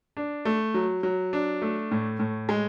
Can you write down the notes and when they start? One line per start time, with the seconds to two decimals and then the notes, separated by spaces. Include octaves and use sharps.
0.17 D4
0.45 A3
0.74 F#3
1.03 F#3
1.33 D4
1.62 A3
1.91 A2
2.19 A2
2.49 G#3